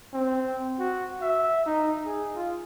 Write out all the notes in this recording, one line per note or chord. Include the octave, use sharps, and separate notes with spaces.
C4
F#4
E5
D#4
G#4
F4